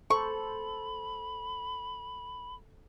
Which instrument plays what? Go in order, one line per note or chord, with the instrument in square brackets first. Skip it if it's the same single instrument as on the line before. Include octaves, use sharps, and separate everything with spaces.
[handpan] A4 C5 [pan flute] B5 [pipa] C#6